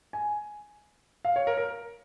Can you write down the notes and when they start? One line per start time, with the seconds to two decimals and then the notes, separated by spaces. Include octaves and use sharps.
0.13 G#5
1.25 F5
1.36 C#5
1.47 A#4
1.57 A#4